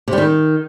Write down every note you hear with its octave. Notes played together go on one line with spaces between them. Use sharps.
C3
G3
D#3